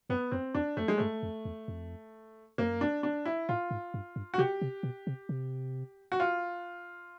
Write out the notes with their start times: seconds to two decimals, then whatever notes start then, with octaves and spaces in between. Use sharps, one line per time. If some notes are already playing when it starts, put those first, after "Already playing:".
0.09 F#2 B3
0.32 F2 C4
0.55 E2 D4
0.77 F2 A3
0.88 G#3
0.98 G2 A3
1.23 F2
1.45 E2
1.68 F2
2.58 F#2 A#3
2.81 D4
3.03 D4
3.25 E4
3.49 A2 F4
3.71 G#2
3.94 G2
4.16 G2
4.34 F#4
4.38 C3 G4
4.61 C3
4.83 B2
5.07 C3
5.29 C3
6.12 F#4
6.20 F4